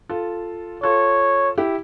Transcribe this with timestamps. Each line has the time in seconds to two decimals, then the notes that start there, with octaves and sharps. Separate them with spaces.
0.09 F4 A4
0.83 F4 A4 C#5
1.58 E4 G4